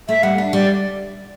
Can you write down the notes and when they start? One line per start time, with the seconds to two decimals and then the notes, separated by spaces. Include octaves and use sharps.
0.09 A3 E5
0.23 G3 F#5
0.38 D4
0.53 G3 D5